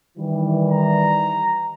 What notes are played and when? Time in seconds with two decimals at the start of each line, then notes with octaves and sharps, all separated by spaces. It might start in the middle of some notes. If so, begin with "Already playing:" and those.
0.18 D#3 E3 G3
0.70 A#5